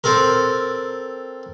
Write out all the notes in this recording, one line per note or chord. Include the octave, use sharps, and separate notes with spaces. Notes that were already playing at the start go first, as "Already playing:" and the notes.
C4 A4 A#4